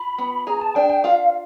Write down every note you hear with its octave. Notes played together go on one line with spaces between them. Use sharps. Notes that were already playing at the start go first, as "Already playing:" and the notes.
Already playing: F4 B5
B3
G#4 A#5
A5
D4 G5
G5
F4 F5